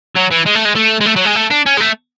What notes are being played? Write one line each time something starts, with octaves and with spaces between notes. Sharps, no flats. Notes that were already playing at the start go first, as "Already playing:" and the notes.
F#3
E3
G#3
A3
G#3
A3
G#3
A3
F#3
G#3
A3
D4
C#4
G#3
A3